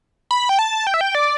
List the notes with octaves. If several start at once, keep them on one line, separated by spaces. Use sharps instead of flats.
B5
G5
A5
G5
E5
G5
D5